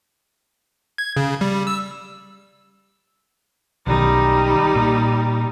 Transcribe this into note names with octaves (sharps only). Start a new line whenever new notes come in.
G#6
C#3
G3
E6
B1 D#3 G3 D#4
A#2